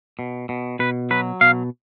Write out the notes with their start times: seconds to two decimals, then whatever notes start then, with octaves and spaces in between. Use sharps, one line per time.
0.19 B2
0.49 B2
0.79 B2 B4
1.11 F#3 B4
1.41 B2 F5